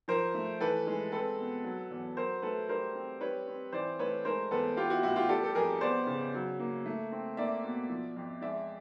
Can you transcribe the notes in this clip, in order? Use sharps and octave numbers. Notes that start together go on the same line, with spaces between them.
F3 A#4 C5
A3
E3 A4 B4
G#3
C4 A4 B4
B2
F#3
E2
F#3 A#4 C5
A3 A4 B4
G3 A#4 C5
C4
G3 B4 C#5
C4
E3 C5 D5
A3 B4 C#5
G#3 A#4 C5
E2 A4 B4
B3 F4 G4
E4 F#4
A2 E4 F#4
F4 G4
G3 G4 A4
A4
F2 G#4 A#4
B3 C5 D5
C#3
F#3
A#3
A3
C4
A#3 D5 E5
B2
F3
F2
G#3 D5 E5